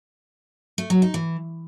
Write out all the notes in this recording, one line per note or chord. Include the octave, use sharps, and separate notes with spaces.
A3
F#3
D#4
E3